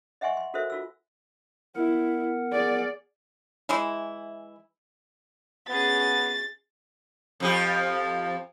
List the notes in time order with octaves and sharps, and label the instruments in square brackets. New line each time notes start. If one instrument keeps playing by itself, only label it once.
[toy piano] D#5 E5 F#5 G#5 C6 C#6
C6
F#4 A4 A#4 C5 E5
F4 F#4 E6
[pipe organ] B3 A#4 F#5 [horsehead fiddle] E4
[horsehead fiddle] G#4 D5
[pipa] E3 G#3 E4
[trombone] B3 [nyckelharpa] C#4 G#4 [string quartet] A6
[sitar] F2 F3 G4